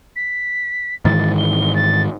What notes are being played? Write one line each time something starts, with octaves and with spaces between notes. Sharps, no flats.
B6
G#2 D#3 E3 A6
G7
A6